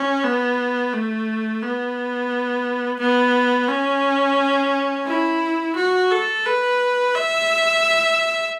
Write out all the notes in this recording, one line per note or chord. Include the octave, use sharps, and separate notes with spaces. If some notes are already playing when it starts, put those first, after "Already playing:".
Already playing: C#4
B3
A3
B3
B3
C#4
E4
F#4
A4
B4
E5